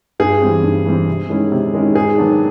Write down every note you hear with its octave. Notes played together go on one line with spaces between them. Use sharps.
G2 G#4
E3 G3 C4
G2
E3 G3 C4
C3
D#3 G#3 C#4 E4
C3
D#3 G#3 C#4 E4
G#2 G#4
D#3 F#3 B3 D4